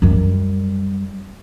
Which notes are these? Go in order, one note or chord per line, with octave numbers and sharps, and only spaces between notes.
F#2 G3